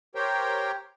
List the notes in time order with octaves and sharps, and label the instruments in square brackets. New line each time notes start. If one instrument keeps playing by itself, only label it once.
[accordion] G4 A#4 C5 C#5 G5